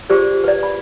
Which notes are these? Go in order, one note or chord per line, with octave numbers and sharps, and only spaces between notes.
F4 G4 G#4 C5 D5
B4 D5
B5